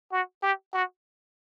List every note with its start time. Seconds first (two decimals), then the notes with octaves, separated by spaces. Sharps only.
0.12 F#4
0.43 G4
0.73 F#4